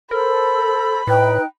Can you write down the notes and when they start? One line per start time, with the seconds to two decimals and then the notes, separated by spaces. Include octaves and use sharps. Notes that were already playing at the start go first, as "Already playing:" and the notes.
0.11 A4 A#4 C5 B5
1.07 A2 D#4 B4 G5 F#6